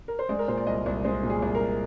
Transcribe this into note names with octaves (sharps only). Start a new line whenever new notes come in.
A#4
C5
G#3 D5
A#4
A#2 C5
D5
C2 D#5
C2
G#3 C5
A#2
G#4
C2
A#4